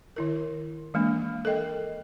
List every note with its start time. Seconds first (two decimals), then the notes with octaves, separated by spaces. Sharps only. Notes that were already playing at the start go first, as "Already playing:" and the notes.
0.16 D#3 E4 A#4
0.94 E3 G#3 A#3 D4
1.45 A4 A#4 D#5 G5